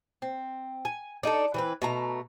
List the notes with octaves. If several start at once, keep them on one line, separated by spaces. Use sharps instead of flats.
C4
G#5
D4 D#4 G#4 A4
E3 C4 B4
B2 A3 A#5